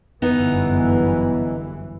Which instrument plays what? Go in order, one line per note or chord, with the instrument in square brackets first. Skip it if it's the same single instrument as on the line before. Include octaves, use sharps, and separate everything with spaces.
[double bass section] G1 F#2 E3 [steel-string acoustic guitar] B3 D#4